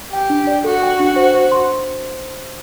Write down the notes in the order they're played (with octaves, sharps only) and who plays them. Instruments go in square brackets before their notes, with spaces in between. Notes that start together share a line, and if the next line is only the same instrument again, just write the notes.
[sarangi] G4 [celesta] G5
[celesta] D4
D5
[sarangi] F#4 [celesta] A4
[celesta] G5
D4
C5
C5
C6